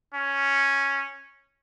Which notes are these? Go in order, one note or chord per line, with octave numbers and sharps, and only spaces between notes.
C#4